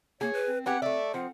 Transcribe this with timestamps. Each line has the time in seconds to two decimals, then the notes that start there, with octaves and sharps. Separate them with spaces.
0.21 A#3 G#4 C#5
0.33 B4
0.47 C4
0.66 B3 C4 G4 G#4 F#5
0.82 A3 D5 E5
1.14 F3 C4 F#5